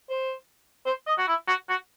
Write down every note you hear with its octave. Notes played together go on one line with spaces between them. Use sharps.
C5
C5
D#5
F#4
E4
F#4
F#4